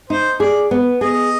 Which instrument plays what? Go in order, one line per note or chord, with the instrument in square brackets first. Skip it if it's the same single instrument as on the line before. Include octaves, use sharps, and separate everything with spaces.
[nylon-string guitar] D#4 [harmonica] C5
[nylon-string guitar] G#4 [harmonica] D5
[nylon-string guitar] B3
[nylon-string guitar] G#4 [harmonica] D#5